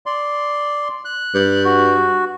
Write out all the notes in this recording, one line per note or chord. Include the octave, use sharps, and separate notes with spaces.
D5 C6
F#6
G2
F#4